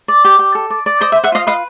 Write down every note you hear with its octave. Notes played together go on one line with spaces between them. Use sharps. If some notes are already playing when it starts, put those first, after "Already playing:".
D5
G4
G4
A4
D5
D5
C5 D#5
E5
C5
E5 F#5
F4 D#5 F5
B4 D#5 F5